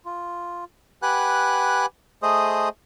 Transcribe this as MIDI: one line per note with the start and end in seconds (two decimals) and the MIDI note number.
0.05 0.64 65
1.02 1.86 67
1.02 1.86 71
1.02 1.86 78
1.02 1.86 80
1.02 1.86 90
2.23 2.69 57
2.23 2.69 68
2.23 2.69 72
2.23 2.69 75
2.23 2.69 87